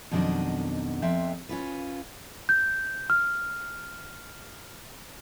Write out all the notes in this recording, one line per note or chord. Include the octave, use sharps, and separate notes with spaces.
F2 B2 D#3 F#3 D4 D#5
F2 C4 E5
C#4 F4 B4
G6
F6